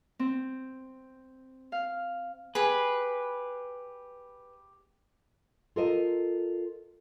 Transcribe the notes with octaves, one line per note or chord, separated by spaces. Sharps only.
C4
F5
G4 G#4 B4
F4 A4 A#4 C5 D#5